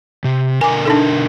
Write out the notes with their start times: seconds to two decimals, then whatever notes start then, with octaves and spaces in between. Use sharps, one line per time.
0.24 C3
0.61 B2 D3 A#4 G#5 D6
0.85 D4 D#4 A4